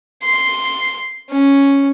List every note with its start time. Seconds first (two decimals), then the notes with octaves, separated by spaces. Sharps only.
0.24 C6
1.31 C#4